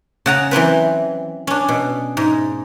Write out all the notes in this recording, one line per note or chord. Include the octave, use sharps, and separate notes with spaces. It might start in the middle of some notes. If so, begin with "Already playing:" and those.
C#3 F#5 A#5
E3 F#3 C4 B4
C#4 D4
B2
G#2